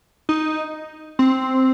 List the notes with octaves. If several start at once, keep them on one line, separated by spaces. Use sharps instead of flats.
D#4
C4